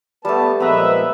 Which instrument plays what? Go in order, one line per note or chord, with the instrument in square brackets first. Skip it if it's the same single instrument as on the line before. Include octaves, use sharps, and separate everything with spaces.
[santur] G3 A3 [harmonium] B3 A5
[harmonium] A#2 F3 G#3 [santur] B3 A#5 [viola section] B4 E5